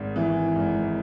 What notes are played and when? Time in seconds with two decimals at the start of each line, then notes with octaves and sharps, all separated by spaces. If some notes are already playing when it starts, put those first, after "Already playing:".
Already playing: G#1 G#2
0.16 E3
0.56 G#1